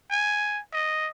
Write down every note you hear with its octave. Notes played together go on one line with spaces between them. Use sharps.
G#5
D#5